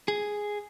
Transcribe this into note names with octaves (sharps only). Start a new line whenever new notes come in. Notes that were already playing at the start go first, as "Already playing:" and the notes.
G#4